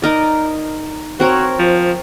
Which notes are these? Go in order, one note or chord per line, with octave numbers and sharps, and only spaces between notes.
D#4 A#4 D5
C4 F#4 A#4 C#5
F3